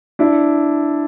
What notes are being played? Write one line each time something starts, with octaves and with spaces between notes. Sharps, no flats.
D4 E4